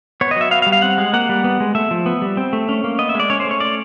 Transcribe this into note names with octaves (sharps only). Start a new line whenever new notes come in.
B3 C#5
D#5
F#3 E5
B3 F5
F5
G3
F5
C4 F#5
G#3
A#3 F#5
G3
B3
G#3
A3 E5
F3
B3
G3
C4
A3
C#4
A#3
B3 D#5
E5
G#3 D5
C#4 C#5
C5
A3
C#5
C#4 D5